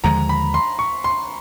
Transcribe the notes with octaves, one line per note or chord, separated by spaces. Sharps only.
D#2 D3 F3 G#3 A#5
B5
C6
C#6
C6